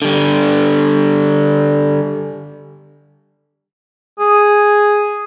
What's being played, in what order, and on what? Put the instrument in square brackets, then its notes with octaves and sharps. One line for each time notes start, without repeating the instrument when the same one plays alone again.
[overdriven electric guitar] D3 G3
[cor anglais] G#4